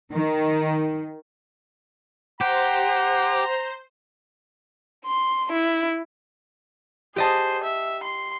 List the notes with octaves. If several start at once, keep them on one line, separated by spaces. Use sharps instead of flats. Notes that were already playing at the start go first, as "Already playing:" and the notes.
D#3
G4 C5 F#5 A#5
C6
E4
G4 G#4 C5 D#5 A5
E5
C6